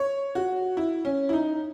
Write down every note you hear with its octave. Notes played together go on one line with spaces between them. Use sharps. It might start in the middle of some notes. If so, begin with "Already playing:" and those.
Already playing: C#5
F#4
E4
C#4
E4
D#4